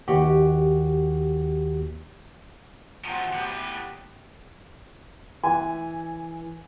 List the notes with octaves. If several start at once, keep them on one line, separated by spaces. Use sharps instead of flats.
D#2 F#4 G4
E2 F3 F#3 G#3 C4
E5
A2 B3 G4 B4
E3 G#5